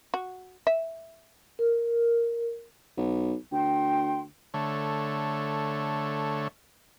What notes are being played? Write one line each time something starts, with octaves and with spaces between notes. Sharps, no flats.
F#4
E5
A#4
B1
D2 G5 C6
D3 A3 C#5